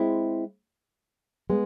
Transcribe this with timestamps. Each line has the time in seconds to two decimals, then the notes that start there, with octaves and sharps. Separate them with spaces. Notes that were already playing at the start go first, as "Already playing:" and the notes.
Already playing: G#3 C4 E4
1.50 G#3 B3